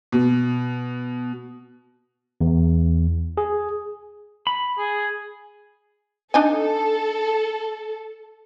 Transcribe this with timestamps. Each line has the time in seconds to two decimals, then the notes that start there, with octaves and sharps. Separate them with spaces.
0.12 B2
2.41 E2
3.37 G#4
4.47 B5
4.78 G#4
6.34 D4 D#4 A4 G#5